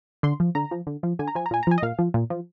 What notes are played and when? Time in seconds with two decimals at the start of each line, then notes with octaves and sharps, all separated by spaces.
0.23 D3 C6
0.40 F3
0.55 D3 A#5
0.71 F3
0.87 D3
1.03 F3
1.19 D3 G#5
1.28 A#5
1.35 F3 G#5
1.46 A#5
1.51 A#2 G#5
1.63 A#5
1.67 F3 G#5
1.78 D#5
1.82 A#2 F5
1.99 F3
2.14 A#2
2.30 F3